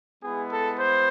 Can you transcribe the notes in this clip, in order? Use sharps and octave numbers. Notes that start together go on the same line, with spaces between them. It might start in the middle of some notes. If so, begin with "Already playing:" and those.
G#3 B3 E4 G#4
A4
C5